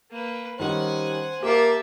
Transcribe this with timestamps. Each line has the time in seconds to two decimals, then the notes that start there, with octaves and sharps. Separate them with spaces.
0.11 A#3 B4
0.59 D#3 G3 C#4 C5 F#5 G#5
1.43 A#3 G4 E5 A5